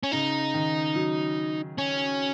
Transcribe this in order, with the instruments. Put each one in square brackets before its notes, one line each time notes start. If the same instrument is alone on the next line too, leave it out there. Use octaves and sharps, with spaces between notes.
[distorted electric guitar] C#4
[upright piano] C#3 [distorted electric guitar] D#4
[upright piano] D#3
F#3
[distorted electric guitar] C#4